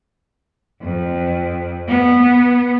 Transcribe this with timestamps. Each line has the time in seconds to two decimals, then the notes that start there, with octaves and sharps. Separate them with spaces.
0.81 F2
1.88 B3